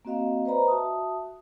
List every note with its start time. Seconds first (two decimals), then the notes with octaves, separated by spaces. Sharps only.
0.05 A#3 C4 F#4 D#5 F5
0.46 B4 C5 D5 D#5 A#5 B5
0.68 F#4 E5 A5 D#6